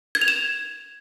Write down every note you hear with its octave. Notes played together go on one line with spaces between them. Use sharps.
G#6
F7
E7